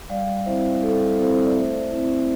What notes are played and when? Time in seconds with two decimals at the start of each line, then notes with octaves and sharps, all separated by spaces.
0.09 G3 D5 F5
0.46 C4 E4 C5 E5
0.83 G3 A4
1.18 C4 E4 A4 C5
1.33 C5
1.45 D5
1.55 A3 C5 E5
1.91 C4 E4